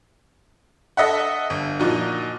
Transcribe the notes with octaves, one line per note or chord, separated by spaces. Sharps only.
A4 D#5 E5 F#5
G1
A#2 F3 D#4 F#4